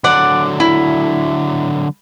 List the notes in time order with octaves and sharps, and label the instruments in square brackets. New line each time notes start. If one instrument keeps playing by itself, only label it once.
[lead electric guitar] D3 F#3 [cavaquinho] D5 F#5
[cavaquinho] E4